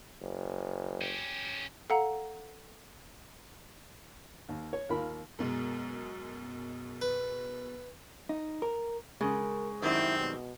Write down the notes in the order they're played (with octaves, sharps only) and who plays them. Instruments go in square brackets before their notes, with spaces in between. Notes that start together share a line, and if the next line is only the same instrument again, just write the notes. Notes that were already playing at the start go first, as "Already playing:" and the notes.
[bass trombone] F#1
[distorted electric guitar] C#4 G4
[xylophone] A4 F5 F#5 A#5
[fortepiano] D#2
C#5
D#2 A#3 F4 A#4 B5
[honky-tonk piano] F#2 B2 G#3
[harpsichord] B4
[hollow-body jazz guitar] D#4
A#4
[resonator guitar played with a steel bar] C#3 [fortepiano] G#3 [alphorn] A#4
[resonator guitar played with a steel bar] F#2 D#3 G3 [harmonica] C4 [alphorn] E4
[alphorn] B2